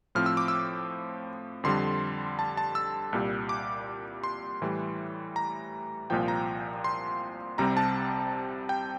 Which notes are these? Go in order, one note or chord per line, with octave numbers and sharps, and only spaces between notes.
A2 F3 C4 F6
E6
D6
E6
F2 D3 G3 C6
A5
A5
E6
C2 A#2 G3
D6
C6
A2 E3 G3
A#5
C2 A#2 F3 G5
A#5
C6
C2 C3 G3 C4 A#5
A5
G5